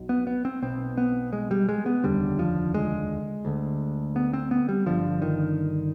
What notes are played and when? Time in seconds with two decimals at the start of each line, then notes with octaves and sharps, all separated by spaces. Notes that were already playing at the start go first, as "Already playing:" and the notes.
Already playing: B1 B2
0.09 B3
0.27 B3
0.45 C4
0.62 B1 B2 C4
0.97 B3
1.33 G#3
1.51 G3
1.69 G#3
1.86 B3
2.04 F1 D#2 D3 G3
2.39 F3
2.74 G#3
3.45 D2 D3
4.16 B3
4.33 C4
4.51 B3
4.69 G3
4.86 G1 F2 D3 F3
5.22 D#3